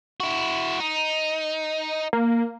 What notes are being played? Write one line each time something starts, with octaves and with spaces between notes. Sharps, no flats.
E4 F#4
D#4
A#3